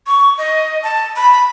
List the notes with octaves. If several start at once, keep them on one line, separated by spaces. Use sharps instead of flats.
C#6
D#5
A5
B5